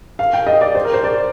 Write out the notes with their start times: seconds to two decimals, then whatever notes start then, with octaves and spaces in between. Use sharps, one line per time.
0.19 F5
0.33 G5
0.47 D#5
0.61 D5
0.75 C5
0.85 A#4
0.94 C5
1.04 D5